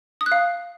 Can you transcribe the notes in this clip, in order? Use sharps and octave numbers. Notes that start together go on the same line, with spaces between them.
D#6
F#6
F5